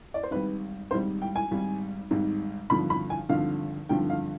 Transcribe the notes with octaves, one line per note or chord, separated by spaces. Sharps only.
D5
C5
G#1 G#2 G3 B4
G#1 G#2 G3 C5
G5
G#5
G#1 G#2 G3
G#1 G#2 G3
G#1 G2 D3 F3 B5
B5
G#5
G#1 G2 D3 F3 F5
G#1 G2 D3 F3 G5
F5